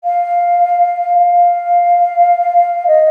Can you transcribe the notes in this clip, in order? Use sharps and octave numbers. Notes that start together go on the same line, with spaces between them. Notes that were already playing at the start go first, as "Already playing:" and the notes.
F5
F5
D#5